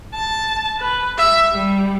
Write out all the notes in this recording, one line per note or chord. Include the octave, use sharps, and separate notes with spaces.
A5
B4
E5
G3